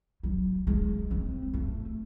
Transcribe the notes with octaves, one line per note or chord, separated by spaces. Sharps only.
F#3
G#3
C4
A3